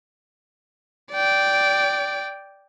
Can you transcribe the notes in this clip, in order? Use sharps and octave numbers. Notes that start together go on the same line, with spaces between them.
D5 G5